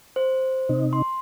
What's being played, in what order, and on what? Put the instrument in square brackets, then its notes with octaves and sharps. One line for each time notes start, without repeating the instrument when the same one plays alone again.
[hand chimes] C5
[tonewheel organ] C3 D#4
[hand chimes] C6